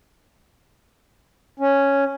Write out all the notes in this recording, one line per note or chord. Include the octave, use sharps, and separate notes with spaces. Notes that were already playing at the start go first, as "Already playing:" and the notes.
C#4